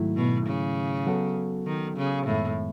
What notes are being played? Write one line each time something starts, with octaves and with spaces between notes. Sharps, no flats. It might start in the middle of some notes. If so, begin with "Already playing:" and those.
Already playing: G#2 D#3 F#3 A3 E4
B2
C#3
F#3 B3 F#4 A4
D#3
C#3
F#2 A2 D#3 G#3 B3